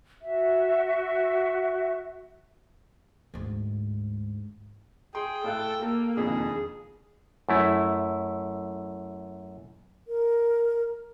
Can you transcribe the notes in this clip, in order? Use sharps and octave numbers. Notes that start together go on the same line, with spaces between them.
F#4 E5
D2 G#2
G#4 G5 C6
A2 A4 F5 F#6
A#3 A4
E1 F2 D#3 G#4
F#2 A3 E4
A#4